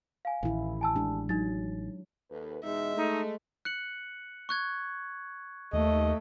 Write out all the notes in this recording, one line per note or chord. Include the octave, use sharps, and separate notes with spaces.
F5 G#5
A1 D#3 E4
G#5 A5 E6
G#3 D4 G4
F#3 D#4 A6
D#2 A4 B4
E2 B2 G#3 D#4 E5
A3 D#4
F#6 C#7 F#7
C#6 F#6 G#6
D#2 A3 D#5